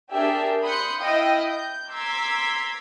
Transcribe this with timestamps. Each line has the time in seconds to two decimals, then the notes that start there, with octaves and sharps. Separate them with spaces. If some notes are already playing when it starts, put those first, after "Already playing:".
0.12 D4 G4 G#4 A#4 E5
0.63 B5 C6 D#6 F#6 G6 C#7
1.00 E4 D#5 F5 G5 B5 D#6
1.48 G6
1.89 A#5 C6 D6 E6 G#6 B6